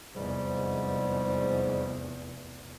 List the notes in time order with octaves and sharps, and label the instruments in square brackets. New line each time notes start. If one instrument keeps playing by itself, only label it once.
[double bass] F1 E2 [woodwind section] G#2 G3